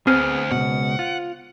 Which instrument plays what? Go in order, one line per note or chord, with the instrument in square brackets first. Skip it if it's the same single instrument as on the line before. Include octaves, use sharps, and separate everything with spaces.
[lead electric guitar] D2 [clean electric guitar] B3 G#4 [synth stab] C4 [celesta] C5 F6
[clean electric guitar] C#2 G2 B2 [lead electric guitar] F#5
[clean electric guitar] F4